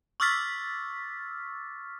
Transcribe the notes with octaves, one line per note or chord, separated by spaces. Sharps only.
C#6 D6 E6 F6 A6 B6